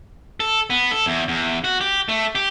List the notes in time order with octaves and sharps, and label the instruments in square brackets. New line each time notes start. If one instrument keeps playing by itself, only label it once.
[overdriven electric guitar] A4
B3
A4
E2
E2
F#4
G4
A3
G4